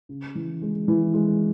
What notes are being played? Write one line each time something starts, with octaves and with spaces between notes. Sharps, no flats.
C#3
E3
G#3
E3
G#3